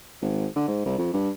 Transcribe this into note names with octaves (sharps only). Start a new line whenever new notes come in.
G#1
D3
G#2
C2
F2
G2